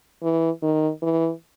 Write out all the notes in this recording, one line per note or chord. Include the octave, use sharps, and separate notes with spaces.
E3
D#3
E3